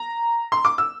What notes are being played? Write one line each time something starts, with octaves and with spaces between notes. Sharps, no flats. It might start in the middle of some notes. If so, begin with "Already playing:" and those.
Already playing: A#5
C6
D6
E6